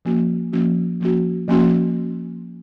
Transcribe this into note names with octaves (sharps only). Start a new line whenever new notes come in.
F3 A#3 C#4 F#4
F3 A#3 C#4 F#4
F3 A#3 C#4 F#4
F3 A#3 C#4 F#4